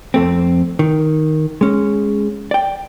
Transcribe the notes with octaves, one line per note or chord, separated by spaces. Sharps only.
F2 A3 C4
D#3
G#3 C#4
D5 G5